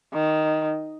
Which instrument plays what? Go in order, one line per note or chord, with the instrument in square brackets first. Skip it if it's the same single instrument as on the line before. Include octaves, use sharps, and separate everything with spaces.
[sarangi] D#3